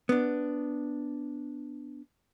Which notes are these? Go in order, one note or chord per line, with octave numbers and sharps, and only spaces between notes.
B3 D4